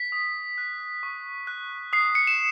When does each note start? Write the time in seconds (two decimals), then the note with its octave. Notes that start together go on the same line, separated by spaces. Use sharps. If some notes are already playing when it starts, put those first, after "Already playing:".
Already playing: B6
0.12 D#6
0.58 F#6
1.03 C#6
1.47 F#6
1.93 D#6 C7
2.15 C#7
2.27 E7